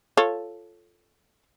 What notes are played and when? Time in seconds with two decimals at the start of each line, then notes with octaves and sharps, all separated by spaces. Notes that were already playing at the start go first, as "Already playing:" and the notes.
0.17 F4 A4 C#5